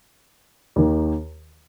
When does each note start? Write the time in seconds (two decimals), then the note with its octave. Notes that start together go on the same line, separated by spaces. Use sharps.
0.76 D#2 D#3